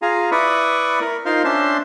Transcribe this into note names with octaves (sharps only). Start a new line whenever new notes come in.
F4 G#4 F5 G#5 A#5
E4 B4 D5 B5 C#6 D#6
A#4
D#4 F4 A#4 C5 F5 C6
C#4 D4 C5 E5 A5 C6